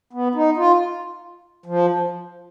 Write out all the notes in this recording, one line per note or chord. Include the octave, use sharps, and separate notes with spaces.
B3
D#4
F4
F3